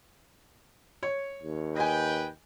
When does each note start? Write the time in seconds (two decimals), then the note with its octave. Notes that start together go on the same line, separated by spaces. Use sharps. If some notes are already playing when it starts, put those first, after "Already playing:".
1.03 C#5
1.43 D#2
1.76 B4 D#5 G5 G#5